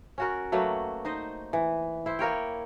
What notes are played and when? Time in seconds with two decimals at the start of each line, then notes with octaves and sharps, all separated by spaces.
0.18 C#4 F#4 A#4
0.52 F#3 A3 A#3 B4
1.05 D#4 C5 D#5
1.53 E3
2.06 E4 C5
2.19 A#3 A#4 C#5 G5